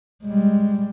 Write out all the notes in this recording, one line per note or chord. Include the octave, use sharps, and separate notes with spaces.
G3 G#3